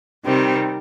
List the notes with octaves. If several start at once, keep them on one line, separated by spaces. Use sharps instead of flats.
C3 D#3 G3 C4